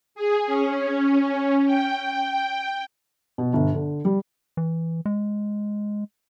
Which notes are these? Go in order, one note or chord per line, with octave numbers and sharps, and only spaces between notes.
G#4
C#4
G5
B2
G1
D3
G3
E3
G#3